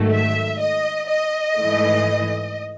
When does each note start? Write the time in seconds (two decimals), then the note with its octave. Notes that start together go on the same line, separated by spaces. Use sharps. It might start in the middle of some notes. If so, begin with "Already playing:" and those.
Already playing: G#2 D#3 F#3 A3
0.13 E5
0.61 D#5
1.09 D#5
1.56 G#2 E3 A3